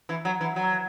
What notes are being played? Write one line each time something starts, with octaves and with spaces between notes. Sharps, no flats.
E3
F#3
E3
F#3